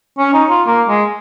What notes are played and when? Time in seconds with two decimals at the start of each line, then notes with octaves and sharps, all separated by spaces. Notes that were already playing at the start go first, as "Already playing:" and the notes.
0.18 C#4
0.33 D#4
0.50 F4
0.67 A#3
0.88 G#3